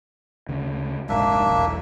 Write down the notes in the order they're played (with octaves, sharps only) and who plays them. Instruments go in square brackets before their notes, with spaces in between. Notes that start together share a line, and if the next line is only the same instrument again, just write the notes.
[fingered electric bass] D2 C#3
[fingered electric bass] F1 A#1 G#2 [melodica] A#3 D4 E5
[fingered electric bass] E1 B1